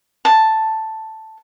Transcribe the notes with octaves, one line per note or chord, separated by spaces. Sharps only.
A5